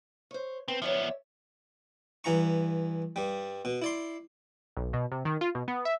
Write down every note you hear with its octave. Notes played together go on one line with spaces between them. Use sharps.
C5 C#5
A3 B3 C4
F3 B3 C#5 D5 E5
G2 E3 A#5 C#6
G2 G3
B2
E4 D5 C6
B1
B2
C3
D#3
F4
B2
B3
E5